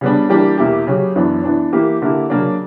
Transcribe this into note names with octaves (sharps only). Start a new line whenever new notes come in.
C#3 G3 B3 D4
E3 G3 A#3 D4 G4
E2 B2 A#3 E4 G4
C#3 F#3 C#4 G4
F#2 E3 B3 D4
E3 B3 D4
E3 A#3 E4 G4
D3 A#3 E4 G4
C#3 F#3 A#3 D4